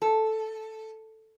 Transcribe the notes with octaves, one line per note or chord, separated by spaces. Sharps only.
A4